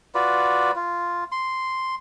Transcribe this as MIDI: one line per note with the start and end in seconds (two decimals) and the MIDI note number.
0.15 0.71 65
0.15 0.71 66
0.15 0.71 71
0.15 0.71 74
0.76 1.24 65
1.32 1.95 84